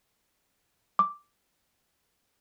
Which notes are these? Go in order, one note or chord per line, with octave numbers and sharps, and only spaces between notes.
D6